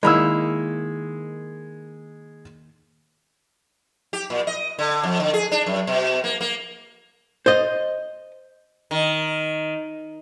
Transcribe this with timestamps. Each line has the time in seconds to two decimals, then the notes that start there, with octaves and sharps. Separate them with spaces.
0.03 D#3 G#3 A#3 E4 B5 E6
4.13 G4
4.30 A#2
4.47 D#5
4.79 D3
5.04 F2
5.20 D3
5.34 G#4
5.52 D4
5.66 F#2
5.87 B2
6.24 A#3
6.41 A#3
7.46 C5 D#5
8.91 D#3